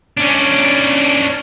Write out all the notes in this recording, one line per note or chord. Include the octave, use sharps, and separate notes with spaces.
C#4 D4